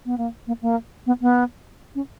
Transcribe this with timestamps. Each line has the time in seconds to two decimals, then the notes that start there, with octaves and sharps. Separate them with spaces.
0.06 B3
0.18 A#3
0.47 A#3
0.62 A#3
1.06 B3
1.21 B3
1.95 C#4